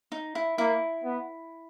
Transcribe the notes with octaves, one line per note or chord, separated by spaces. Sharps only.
D#4
E4
A#3 E4
B3